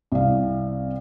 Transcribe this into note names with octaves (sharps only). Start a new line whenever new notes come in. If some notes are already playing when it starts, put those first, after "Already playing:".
C2 F5